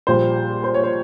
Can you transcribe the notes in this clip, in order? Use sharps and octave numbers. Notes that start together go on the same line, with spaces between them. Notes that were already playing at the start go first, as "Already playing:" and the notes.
A#1 A#2 G3 C5
C5
C#5
C5